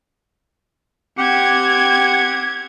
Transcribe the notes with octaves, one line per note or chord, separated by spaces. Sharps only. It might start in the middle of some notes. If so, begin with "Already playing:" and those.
C4 G4 F#5 G#6